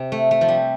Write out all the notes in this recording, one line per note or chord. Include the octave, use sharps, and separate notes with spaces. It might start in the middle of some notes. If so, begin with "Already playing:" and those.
Already playing: C3
A3
A3
F3
G3